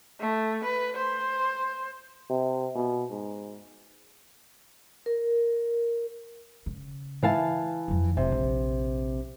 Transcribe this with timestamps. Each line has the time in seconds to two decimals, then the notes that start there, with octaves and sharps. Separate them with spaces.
0.20 A3
0.65 B4
0.96 C5
2.30 C3
2.75 B2
3.11 G#2
5.06 A#4
6.66 C#3
7.23 E3 F5 A5
7.88 F2 F#3
8.17 F1 C3
8.32 A#1